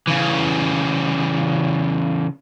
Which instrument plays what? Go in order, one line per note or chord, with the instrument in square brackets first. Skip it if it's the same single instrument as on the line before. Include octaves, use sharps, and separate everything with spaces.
[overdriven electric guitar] C#3 E3